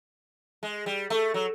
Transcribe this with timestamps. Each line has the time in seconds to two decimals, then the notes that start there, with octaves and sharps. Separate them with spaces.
0.63 G#3
0.86 G3
1.10 A3
1.34 F#3